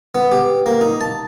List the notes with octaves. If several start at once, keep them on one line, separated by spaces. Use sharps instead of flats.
B3
G4
A#3
D#4
A5